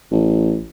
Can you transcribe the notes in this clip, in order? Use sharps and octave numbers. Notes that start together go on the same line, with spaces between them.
A1